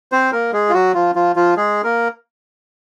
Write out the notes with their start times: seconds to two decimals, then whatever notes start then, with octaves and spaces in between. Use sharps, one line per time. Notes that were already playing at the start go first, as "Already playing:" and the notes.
0.12 C4 C5
0.32 A#3 A#4
0.53 G#3 G#4
0.69 F4
0.73 F#3 F#4
0.94 F3 F4
1.15 F3 F4
1.36 F3 F4
1.57 G#3 G#4
1.84 A#3 A#4